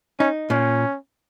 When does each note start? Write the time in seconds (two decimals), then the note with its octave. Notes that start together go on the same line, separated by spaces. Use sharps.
0.19 C#4 D#4
0.50 A#2 C#4